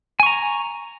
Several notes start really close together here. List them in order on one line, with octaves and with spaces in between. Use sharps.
G#5 C#6 A#5